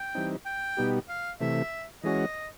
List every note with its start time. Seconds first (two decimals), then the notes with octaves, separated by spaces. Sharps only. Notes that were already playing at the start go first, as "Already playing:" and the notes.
Already playing: G5
0.15 E3 G3 C4 D#4
0.46 G5
0.77 B2 G3 B3 D#4 G4
1.09 F5
1.41 C3 E3 A3 E5
2.03 E3 G#3 C#4 F#4 D#5